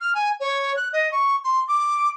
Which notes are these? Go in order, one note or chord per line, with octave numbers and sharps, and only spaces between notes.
F6
G#5
C#5
F#6
D#5
C#6
C6
D6